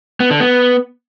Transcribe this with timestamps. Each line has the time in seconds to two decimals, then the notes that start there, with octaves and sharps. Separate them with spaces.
0.20 B3
0.30 D3
0.40 B3